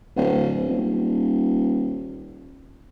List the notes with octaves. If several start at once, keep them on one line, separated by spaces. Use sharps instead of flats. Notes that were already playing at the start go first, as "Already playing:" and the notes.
D1
D#1